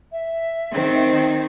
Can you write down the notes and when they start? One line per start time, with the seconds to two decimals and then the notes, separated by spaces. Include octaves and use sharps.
0.12 E5
0.70 D#3 C4